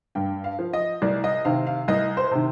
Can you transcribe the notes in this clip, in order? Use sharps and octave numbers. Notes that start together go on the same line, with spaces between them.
G2 G5
F5
F3
D#5
C2 D5
D#5
C3 D#3 F5
F5
C2 D#5
C5
C3 D#3